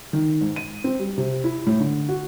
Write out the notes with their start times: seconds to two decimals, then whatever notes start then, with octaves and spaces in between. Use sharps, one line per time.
0.13 D#3
0.41 G#2
0.56 D#7
0.84 C4
0.99 G3
1.18 C3
1.44 E4
1.66 A2
1.80 D3
2.09 F#4